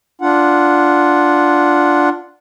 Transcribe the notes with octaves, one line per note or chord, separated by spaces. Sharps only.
D4 F4 F#5